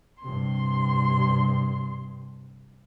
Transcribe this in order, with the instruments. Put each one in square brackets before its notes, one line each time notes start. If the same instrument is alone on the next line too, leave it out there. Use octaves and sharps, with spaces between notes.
[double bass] G2 C3 [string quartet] C6